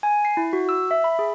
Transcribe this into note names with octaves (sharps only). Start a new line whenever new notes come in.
G#5
C7
E4
F#4
E6
E5
B5
G#4